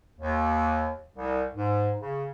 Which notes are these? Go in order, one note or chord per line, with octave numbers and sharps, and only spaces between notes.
D#2
C2
G#2
C#3